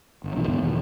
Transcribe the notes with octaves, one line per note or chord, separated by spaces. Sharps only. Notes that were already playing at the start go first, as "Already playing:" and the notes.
G1
A#1 B2 E3
D#2 G#2 D3 B3
E2 B2 D#3 F3